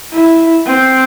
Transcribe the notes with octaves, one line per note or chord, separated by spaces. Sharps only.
E4
C4